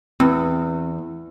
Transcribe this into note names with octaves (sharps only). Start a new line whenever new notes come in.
E2 C4